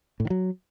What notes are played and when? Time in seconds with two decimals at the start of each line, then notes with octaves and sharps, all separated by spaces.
0.20 A2
0.25 D#3
0.30 F#3